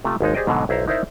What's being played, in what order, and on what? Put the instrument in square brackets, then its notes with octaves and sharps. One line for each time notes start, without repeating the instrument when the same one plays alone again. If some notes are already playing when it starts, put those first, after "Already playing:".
[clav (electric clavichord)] C3 A3 F4 A#5
G#1 D#2 G#3 D#4
G4 G#4 C5 D5 D#5 G5
G#2 B2 D3 F#3
B1 E4 C5 A#5
D#4 E4 A#4 C5 D5 E5